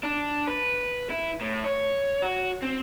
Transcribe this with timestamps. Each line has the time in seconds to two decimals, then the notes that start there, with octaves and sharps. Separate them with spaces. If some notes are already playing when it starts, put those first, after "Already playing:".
0.03 D4
0.47 B4
1.10 E4
1.41 A2
1.64 C#5
2.22 F#4
2.62 C4